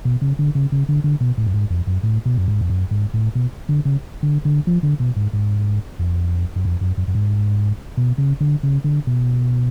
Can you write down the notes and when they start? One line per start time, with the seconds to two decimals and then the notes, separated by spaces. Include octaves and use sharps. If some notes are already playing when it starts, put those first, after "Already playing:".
0.05 B2
0.22 C#3
0.39 D3
0.55 C#3
0.72 C#3
0.89 D3
1.04 D3
1.21 B2
1.38 A2
1.46 F#2
1.54 G#2
1.70 F2
1.87 F#2
2.03 A2
2.25 B2
2.37 F#2
2.48 G#2
2.61 F2
2.70 F#2
2.91 G#2
3.14 A2
3.35 B2
3.69 D3
3.85 C#3
4.23 D3
4.45 D3
4.67 F3
4.83 D3
5.00 B2
5.16 G#2
5.33 G#2
5.99 F2
6.56 F#2
6.65 F2
6.81 F#2
6.97 F#2
7.08 F#2
7.15 G#2
7.97 B2
8.18 C#3
8.40 D3
8.63 C#3
8.84 D3
9.07 B2